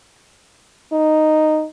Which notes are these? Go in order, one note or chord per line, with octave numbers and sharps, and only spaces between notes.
D#4